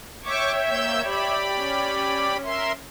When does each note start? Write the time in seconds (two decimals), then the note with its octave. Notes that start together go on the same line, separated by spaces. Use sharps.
0.24 C#5 E5 G5 C#6 D6
0.67 A#3 E6 G6
1.04 G4 D5 B5
1.54 C#4
2.43 A#4 E5 C6